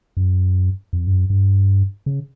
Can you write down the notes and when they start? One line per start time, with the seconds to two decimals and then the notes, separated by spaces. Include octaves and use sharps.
0.17 F#2
0.93 F2
1.07 G2
1.12 F#2
1.30 G2
2.06 C#3